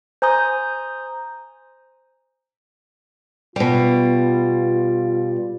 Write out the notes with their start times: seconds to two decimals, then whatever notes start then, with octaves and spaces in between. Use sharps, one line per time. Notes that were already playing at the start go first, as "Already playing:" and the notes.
0.22 C5 G#5 A#5 D#6 G6
3.56 B2 G3 F4